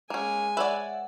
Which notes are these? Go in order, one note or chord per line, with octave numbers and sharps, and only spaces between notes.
G#3 A#3 C#4 G#5
B4 C#5 D5 E5 F#5